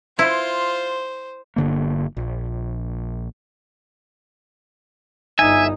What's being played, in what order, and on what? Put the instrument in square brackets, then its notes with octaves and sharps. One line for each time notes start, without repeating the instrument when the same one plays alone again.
[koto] E4 [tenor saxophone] F4 [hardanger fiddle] C5
[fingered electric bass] G1 D3 A#3
A#1
[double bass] G1 D#4 [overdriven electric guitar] E5 [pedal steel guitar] G#5